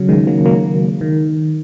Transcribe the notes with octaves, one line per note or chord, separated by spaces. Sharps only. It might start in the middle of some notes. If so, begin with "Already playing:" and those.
Already playing: C#3 F#3
D#3 G#3
F#3 A#3
F#3 A#3
D#3